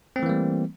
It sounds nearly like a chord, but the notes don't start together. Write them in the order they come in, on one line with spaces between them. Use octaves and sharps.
C4 A3 E3 A#3 G3